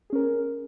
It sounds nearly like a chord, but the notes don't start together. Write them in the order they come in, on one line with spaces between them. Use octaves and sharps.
G#4 C#4 A#4